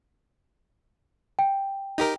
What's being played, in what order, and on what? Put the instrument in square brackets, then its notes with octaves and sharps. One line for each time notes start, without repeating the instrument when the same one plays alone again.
[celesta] G5
[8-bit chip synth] D#4 G4 A#4